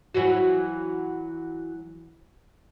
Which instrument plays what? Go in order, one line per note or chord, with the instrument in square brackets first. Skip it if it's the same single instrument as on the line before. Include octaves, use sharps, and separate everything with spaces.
[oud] E3 F#3 F#4